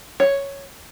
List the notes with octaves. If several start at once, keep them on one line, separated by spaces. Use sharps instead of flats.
C#5